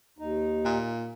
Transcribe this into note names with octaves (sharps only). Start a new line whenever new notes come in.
D#2 D#4
A#2